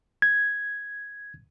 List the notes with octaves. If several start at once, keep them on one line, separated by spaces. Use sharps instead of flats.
G#6